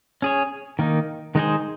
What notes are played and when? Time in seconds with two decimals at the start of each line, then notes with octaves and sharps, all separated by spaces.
0.22 C#4 G#4 C#5
0.79 D#3 A#3 D#4
1.35 D#3 G#3 D#4 G#4 C5